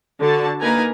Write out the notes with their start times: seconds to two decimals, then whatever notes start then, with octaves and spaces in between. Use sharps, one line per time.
0.21 D3 F#4 A5
0.60 A#3 D#4 A#4 B4 G#5 A#5